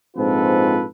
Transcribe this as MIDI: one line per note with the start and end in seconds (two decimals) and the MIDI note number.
0.16 0.85 34
0.16 0.85 44
0.16 0.85 60
0.16 0.85 65
0.16 0.85 69
0.16 0.85 71